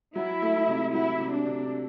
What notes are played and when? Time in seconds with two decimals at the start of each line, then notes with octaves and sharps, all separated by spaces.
0.15 F#3 E4
0.42 A3
0.68 C3
0.94 F#3 E4
1.20 C3
1.32 D4
1.46 C3